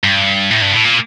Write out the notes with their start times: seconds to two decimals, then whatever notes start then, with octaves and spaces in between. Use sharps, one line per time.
0.04 G2
0.50 A2
0.62 G2
0.73 A2
0.85 A#2